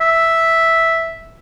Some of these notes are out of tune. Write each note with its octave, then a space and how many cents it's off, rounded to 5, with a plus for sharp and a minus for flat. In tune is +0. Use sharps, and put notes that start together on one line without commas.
E5 -5